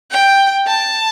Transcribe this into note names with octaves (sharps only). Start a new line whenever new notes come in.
G5
A5